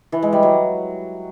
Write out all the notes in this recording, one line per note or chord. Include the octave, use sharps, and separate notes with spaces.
E3
G#3
G3
F#3